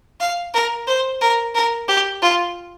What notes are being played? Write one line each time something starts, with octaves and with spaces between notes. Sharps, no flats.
F5
A#4
C5
A#4
A#4
G4
F4